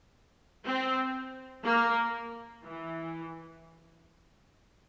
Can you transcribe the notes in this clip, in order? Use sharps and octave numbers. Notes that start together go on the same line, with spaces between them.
C4
A#3
E3